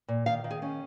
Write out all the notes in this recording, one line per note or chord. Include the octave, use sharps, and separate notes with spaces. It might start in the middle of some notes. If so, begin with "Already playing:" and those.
A#2
D#3 F5
D#3
G#4
C#4